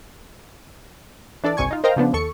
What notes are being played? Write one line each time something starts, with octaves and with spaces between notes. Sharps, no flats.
E3 D4 A4 D5
G1 C2 C3 G#5 C#6 G#6
D#4 F4
A#4 C5 D#5 F5 G5 A#5
C#3 F3 B3 D4
D#2 A4 C#6 C#7